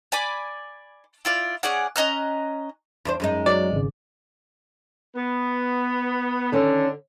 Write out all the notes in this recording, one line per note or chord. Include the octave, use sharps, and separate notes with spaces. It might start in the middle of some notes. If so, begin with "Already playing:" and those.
D5 G#5 B5 D6
E4 F4 D5
C#4 G#4 D5 F#5
C#4 D#5 A#5 F#6
E2 D4 C5
F#2 G#3 D#4
F#3 D5
G#1 C#3
B3
D3 D#3 C#4